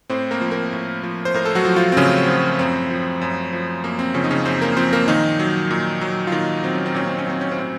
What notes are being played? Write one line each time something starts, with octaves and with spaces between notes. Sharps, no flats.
A2 C4 C5
A#3 A#4
F3
A#3 A#4
A2
F3
C5
A2 A#4
A4
F#3 F#4
F3
F3 F4
C4
A2 C#3 C#4
F3
F#2 C4
F3
F#2
F3
F#2 A#3
C4
C#3 F3 C#4
D#4
C#3 C#4
F#2 C4 C5
A#3 A#4
F3 C4 C5
A#3 A#4
A#2 D#3 D#4
F#3
A#2
F#3
F4
A#2 D#3 D#4
F#3 C4
C#4
C4
A#2 C#4
C4
C#4
F#3 C4
C#4
A2 C4